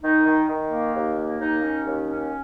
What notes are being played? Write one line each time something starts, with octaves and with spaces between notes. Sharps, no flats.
D#3 D#4
D#3
D#3
A#3
D#2
A#3
D#2 D#4
C#4
D#2
C#4